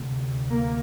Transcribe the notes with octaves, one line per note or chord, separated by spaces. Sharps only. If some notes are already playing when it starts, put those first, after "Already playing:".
Already playing: D2 C3
A#3